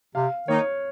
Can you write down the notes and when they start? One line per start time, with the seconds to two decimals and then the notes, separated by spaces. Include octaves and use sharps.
0.14 C3 F5
0.48 D#3 A#3 D#4 C#5